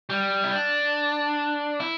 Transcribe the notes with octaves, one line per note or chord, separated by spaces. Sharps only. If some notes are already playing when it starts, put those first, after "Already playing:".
G3
E4
D4
E4